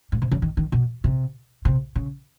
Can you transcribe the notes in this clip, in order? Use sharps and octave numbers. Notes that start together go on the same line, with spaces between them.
G#2
C3
C#3
D#3
D#3
B2
C3
C3
C#3